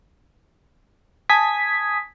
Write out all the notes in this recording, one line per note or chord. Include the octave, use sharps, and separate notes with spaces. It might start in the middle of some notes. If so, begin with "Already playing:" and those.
G#5 A5 D#6 G#6 B6